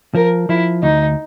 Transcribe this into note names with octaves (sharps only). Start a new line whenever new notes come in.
F3 A#4
F3 E4
D2 D#4